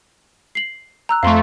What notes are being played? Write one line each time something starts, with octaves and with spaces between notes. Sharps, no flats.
C7 F#7
A#5 E6 F#6
F2 A3 F5 C6 C#6